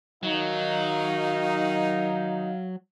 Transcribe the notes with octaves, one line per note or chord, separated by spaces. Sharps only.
D#3 F#3 D#4 F5